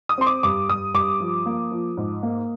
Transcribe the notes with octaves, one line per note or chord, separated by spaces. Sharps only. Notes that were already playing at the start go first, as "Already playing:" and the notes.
D#6
C4 C6
D6
G2 D6
G2 D#6
G2 D6
F3
A#3
F3
G#2
A#3